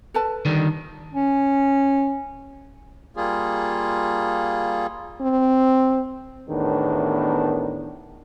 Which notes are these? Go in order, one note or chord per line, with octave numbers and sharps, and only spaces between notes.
A4 B4 A5
D3 D#3 G3
C#4
G3 A#3 F4 G#4
C4
E2 A2 D#3 B3 D4 A#4